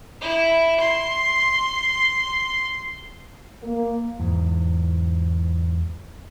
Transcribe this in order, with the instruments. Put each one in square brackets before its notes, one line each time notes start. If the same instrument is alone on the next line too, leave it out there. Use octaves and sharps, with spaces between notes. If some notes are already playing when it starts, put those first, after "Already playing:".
[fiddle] E4
C6
[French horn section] A#3
[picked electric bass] E2 G#2